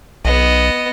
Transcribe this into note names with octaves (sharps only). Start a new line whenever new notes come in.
B1 B3 D#5